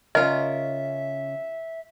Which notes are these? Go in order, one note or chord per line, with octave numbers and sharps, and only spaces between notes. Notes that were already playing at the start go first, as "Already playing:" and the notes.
C#3 C#4 F4 A#4 C#5 D#5 E5